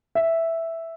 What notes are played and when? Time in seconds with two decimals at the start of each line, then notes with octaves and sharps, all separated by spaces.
0.15 E5